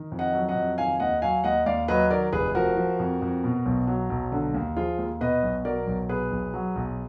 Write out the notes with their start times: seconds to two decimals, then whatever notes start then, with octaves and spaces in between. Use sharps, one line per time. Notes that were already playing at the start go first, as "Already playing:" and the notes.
Already playing: D#3
0.12 F2
0.19 D#5 F#5
0.33 F#3
0.48 D#5 F#5
0.55 F2
0.78 D#3 F5 G#5
1.00 D#2 D#5 F#5
1.22 F#3 F5 G#5
1.44 D#2 D#5 F#5
1.66 D#2 D5 F5
1.88 F#3 B4 D#5
2.11 D#3 A#4 D5
2.32 F1 G#4 B4
2.55 F3 F#4 A#4
2.77 F3
2.99 F2
3.22 F2
3.44 B2
3.65 B1
3.87 F#3
4.10 B1
4.32 D3
4.54 D#2
4.76 F3 F4 G#4
4.98 D#2
5.21 B2 B4 D#5
5.43 B1
5.65 F#3 A#4 D5
5.87 B1
6.09 B2 G#4 B4
6.31 B1
6.54 F#3
6.76 B1